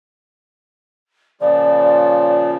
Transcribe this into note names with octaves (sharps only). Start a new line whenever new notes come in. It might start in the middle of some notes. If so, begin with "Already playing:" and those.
A#2 C#3 F3 D5